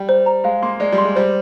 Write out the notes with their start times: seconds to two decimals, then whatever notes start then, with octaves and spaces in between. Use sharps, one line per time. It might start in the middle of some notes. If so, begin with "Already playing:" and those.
Already playing: G3 G5
0.09 C5
0.26 A#5
0.44 G#3 F5
0.62 A#3 C6
0.80 G#3 D5
0.92 G3
0.98 C6
1.04 G#3
1.16 G3 C5